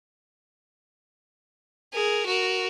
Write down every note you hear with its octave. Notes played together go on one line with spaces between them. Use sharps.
G#4 A#4
F#4 A#4